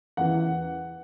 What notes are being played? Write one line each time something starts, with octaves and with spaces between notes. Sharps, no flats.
E2 C#3 E3 F#5